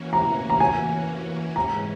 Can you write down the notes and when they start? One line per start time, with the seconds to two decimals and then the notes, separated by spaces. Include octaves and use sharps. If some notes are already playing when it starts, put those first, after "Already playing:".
Already playing: E3 A#3 C#4 F#4
0.13 A#5
0.50 A#5
0.60 G#5
1.56 G#2 E3 G#3 C#4 A#5